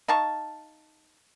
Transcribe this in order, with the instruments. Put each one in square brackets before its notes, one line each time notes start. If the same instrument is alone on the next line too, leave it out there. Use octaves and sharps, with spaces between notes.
[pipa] D#4 F5 A5 C#6